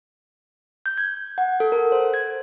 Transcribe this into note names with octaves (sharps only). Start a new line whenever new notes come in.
G6
G#6
F#5
A4
A#4
C5
G#6